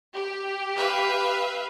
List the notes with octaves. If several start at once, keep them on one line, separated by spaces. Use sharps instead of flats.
G4
B4 E5 F5